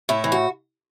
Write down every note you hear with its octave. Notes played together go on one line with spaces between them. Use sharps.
A2 E4
E3
F#4